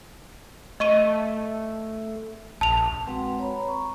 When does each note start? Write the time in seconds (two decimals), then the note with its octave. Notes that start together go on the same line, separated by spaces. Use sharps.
0.80 A3 D#5 C#6 D#7
2.61 A#1 A5 F7
3.07 G#3 C4 F#4 B4 F#5 G5
3.39 C#5 A#5 B5
3.65 A#5 C#6